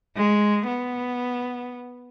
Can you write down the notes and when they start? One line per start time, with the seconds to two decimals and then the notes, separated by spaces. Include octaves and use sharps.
0.17 G#3
0.67 B3